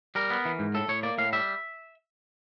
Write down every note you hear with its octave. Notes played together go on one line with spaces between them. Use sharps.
G3 A#4
B3
E3
G#2
A2 A4
A2 C#5
A#3 D5
A2 F5
G3 E5